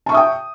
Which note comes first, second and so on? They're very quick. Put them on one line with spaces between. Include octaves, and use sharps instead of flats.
A5 C#6 E5 D#6 G5